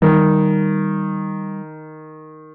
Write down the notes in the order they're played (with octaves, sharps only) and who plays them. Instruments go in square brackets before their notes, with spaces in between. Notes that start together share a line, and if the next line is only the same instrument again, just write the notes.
[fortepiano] D#3 [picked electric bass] G3